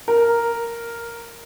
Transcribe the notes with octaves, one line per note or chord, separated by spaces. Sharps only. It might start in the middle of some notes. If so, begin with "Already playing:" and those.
A#4